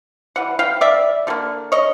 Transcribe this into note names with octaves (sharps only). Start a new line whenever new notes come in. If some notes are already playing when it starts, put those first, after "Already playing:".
E3 G3 F#5
F5 G5
D5 E5
D3 G3 A#3
C#5 D#5